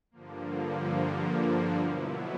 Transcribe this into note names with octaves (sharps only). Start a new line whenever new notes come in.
G2 D3 F3 A#3
B2 F#3 B3 E4